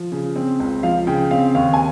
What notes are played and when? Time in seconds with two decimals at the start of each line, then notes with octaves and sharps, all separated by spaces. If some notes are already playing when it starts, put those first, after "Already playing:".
Already playing: F3
0.12 C#3
0.36 C4
0.60 C#2
0.83 F3 F5
1.07 C#3 G5
1.31 C4 F5
1.55 D#2 F5
1.74 G#5